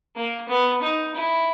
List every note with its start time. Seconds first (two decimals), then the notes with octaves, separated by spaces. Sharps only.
0.16 A#3
0.48 B3
0.82 D#4
1.14 E4